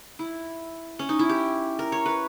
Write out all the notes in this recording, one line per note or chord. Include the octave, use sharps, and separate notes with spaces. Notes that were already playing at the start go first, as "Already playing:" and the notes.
E4
C#4
D#4
E4
G4
A#4
C#5
B4